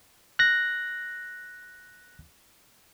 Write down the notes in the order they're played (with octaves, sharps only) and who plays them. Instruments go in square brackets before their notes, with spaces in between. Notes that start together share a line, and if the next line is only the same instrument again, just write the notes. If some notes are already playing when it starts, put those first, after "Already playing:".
[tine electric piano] F#6 A#6